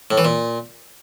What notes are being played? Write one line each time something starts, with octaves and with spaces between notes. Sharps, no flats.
A2
E3
A#2